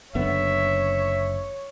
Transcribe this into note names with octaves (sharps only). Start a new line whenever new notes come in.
F#1 D3 B3 C#5 E5